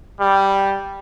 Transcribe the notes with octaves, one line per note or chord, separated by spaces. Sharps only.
G3